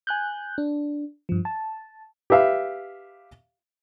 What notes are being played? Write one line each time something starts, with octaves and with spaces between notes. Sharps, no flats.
G#5 F#6 G6
D4
G2 F3
A5
G4 B4 E5 F5